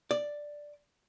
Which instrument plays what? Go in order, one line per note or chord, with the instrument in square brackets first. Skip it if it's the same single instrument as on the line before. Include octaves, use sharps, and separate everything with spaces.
[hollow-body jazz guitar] D5